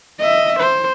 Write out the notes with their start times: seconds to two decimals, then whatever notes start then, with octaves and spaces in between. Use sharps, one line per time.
0.20 D#5 E5
0.60 C5